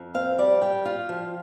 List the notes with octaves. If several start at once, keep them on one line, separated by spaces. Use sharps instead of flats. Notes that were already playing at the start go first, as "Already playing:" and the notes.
Already playing: F2
C4 F5
G3 D5
G3 G5
F4
F3